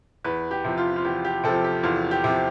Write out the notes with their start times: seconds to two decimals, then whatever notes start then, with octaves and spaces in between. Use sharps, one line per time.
0.24 E2 B4
0.51 G4
0.65 C3 F3
0.77 F4
0.96 F4
1.05 E2 G4
1.25 G4
1.44 C3 F3 A4
1.64 G4
1.83 E2 F4
2.11 G4
2.24 C3 F3